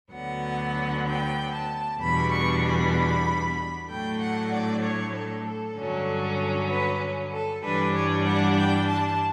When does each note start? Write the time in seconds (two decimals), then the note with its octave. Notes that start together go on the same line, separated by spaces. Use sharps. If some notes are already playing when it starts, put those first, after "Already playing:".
0.12 D2 D3 F#3 B3 F#5
1.06 G5
1.53 A5
1.99 E2 B2 G3 D4 B5
2.31 C#6
2.63 B5
3.88 A2 F#3 A3 D4 G5
4.19 F#5
4.51 D5
4.81 C#5
5.13 A4
5.44 A4
5.76 G2 D3 F#3 C#4
6.69 B4
7.31 A4
7.63 G2 E3 G3 D4 B4
7.94 C#5
8.25 F#5
8.57 G5
8.87 A5